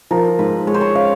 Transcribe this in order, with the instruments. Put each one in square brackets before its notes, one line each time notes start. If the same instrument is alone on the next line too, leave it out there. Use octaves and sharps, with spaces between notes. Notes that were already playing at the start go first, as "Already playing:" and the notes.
[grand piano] F3 [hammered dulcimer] A#4
[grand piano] G#2 [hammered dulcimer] B4
[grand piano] G#3 [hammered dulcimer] C#5
[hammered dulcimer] C5
C#5
[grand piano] C#4 [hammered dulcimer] F5